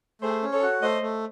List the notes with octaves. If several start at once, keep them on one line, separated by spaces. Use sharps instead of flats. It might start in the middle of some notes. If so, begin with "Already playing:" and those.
A3 G#4 C5
C#4
A4 C#5
F#4
A3 C5 D#5
A3